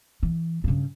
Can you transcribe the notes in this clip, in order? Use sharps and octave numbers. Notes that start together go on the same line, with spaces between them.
E3
G2 C#3